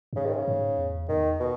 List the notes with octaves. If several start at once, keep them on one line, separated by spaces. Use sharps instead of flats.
F#2
G#2 C#3
D#3
C#3
G#2
E2
E2 D#3
B2